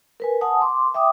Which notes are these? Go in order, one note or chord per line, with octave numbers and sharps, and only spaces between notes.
A#4 B4 G#5
F#5 G#5 A5 D#6
C6 D6
E5 G5 D6 D#6